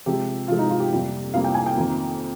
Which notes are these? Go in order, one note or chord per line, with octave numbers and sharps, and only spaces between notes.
C3 F3 G#3 G4
C3 F3 G#3 F4
D#4
F4
G4
F2 C3 G3 A#3
F2 C3 G3 A#3 F5
G5
G#5
G5
F2 D#3 A#3